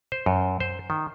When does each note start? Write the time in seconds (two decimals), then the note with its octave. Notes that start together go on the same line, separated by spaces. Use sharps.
0.12 C5
0.26 F#2
0.60 C5
0.90 D#3